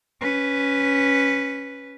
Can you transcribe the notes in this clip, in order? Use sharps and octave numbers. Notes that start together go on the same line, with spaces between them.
C#4 B4